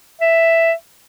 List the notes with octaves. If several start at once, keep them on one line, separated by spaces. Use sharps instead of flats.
E5